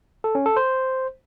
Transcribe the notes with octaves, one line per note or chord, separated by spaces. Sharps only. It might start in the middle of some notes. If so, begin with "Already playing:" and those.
A4
C#4
A4
C5